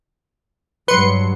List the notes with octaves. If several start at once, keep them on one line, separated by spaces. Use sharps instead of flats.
G2 F#3 B4 C6 C#7